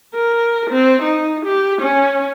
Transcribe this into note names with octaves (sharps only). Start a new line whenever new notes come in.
A#4
C4
D#4
G4
C#4